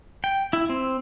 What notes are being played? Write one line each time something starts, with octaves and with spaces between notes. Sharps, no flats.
G5
E4
C4